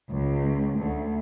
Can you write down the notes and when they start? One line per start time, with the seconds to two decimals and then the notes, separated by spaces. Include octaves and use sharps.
0.11 C#2
0.78 D2